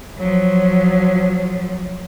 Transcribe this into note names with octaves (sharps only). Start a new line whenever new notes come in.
F3 F#3